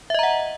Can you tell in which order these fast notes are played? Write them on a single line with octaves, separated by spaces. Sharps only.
E5 D#5 A#5 F#5